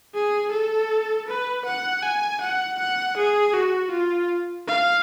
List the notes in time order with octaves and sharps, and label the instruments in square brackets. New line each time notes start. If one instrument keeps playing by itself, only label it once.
[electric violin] G#4
A4
B4
F#5
G#5
F#5
F#5
G#4
F#4
F4
F5